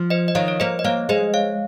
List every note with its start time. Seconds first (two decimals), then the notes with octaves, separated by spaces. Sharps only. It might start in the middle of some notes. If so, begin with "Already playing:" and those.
Already playing: F3
0.10 C5 D#5
0.28 D#5
0.35 D#3 C#5 F5
0.48 C#5
0.60 A#3 C5 D#5
0.79 D#5
0.84 A#3 C#5 F5
1.09 G#3 C5 D#5
1.34 C#5 F5